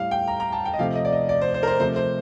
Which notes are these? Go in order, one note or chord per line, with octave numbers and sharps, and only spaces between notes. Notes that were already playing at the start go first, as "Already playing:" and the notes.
Already playing: A2 G3 F5
G5
A#5
A#5
A5
G5
D#5
C3 F3 A3 F5
D#5
D5
D#5
D5
C5
C5
A#4
C5
C3 F3 A3 C5
C5